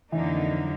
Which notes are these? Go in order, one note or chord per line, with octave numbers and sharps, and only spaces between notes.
F2 D3 E3 F#3 A#3 D#4